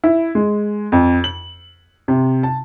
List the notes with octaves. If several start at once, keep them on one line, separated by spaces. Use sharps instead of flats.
E4
G#3
F2
F#7
C3
A5